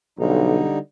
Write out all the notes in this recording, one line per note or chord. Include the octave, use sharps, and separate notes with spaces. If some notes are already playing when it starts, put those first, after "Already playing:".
B1 D3 G3 D#4